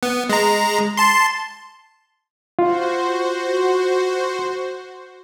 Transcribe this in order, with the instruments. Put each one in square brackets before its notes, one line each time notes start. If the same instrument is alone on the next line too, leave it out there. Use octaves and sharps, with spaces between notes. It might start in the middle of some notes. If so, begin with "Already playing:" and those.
[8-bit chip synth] B3
G#3 A#5
A5 C6
[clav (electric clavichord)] F4 [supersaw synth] F#4 C5